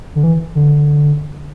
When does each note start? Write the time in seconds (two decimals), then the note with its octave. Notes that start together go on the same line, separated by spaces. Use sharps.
0.15 D3
0.24 E3
0.55 D3